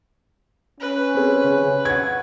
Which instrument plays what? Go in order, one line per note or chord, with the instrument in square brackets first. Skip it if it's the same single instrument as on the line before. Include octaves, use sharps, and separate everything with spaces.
[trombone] C#4 [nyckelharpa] B4
[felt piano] C4 G#4
C#3
F#5 G#6